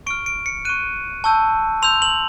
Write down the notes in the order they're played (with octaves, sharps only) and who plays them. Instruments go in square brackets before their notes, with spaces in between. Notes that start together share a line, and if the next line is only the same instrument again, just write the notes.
[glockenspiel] C#6 F6 D7
D7
C#7
C#6 F#6 D#7
A5 C#6 E6 G6
C6 E6 G6 F7
F#7